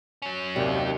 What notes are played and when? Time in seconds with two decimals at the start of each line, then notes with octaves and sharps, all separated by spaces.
0.22 F#3 C#4
0.56 D#2 C3 G3